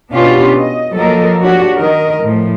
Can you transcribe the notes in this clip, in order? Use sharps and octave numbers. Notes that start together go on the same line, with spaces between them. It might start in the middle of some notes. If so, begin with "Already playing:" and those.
B2 B3 C#4 D4 F4 G4
D#5
F3 F#3 A#3 A4 A#4 D#5
F3 D4 F#4 G4 C#5
D#3 A#4 D#5
A2 F3